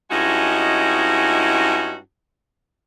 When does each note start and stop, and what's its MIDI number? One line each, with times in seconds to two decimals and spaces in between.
0.11 1.98 43
0.11 1.98 56
0.11 1.98 61
0.11 1.98 63
0.11 1.98 64
0.11 1.98 66